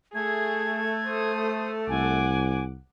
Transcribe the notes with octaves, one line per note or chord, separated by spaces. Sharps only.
A3 G#4 G#6
C5 D#6
C2 F#5 G#5 D6